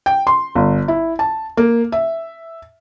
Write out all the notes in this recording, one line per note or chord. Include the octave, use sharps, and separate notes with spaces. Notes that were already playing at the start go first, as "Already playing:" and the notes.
G5
C6
G1
E4
A5
A#3
E5